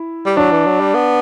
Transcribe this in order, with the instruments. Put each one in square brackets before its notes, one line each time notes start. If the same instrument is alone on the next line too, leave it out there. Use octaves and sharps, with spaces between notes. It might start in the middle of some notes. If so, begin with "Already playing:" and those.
Already playing: [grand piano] E4
[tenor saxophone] G3
[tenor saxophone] F#3 [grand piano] D4
[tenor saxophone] E3
F#3
G3
B3